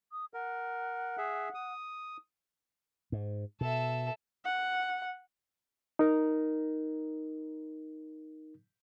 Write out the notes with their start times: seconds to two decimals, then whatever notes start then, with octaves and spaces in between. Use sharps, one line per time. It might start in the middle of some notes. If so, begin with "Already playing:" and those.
0.12 D#6
0.34 A#4 F#5
1.18 G#4 E5
1.55 D#6
3.12 G#2
3.61 B2 A4 E5
4.45 F#5
5.99 D#4 A#4